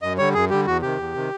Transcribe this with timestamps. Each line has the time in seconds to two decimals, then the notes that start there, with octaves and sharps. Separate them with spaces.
0.02 F#2 D#5
0.18 D3 G3 C#5
0.34 F#2 G#4
0.50 D3 G3 G4
0.66 E2 F#4
0.82 C3 D#3 G4
0.98 E2
1.14 C3 D#3